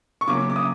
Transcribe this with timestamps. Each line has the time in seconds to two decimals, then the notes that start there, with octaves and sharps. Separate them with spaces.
0.21 C#6
0.28 C#3 F#3 A#3 C#4 D6
0.50 D6
0.56 D#6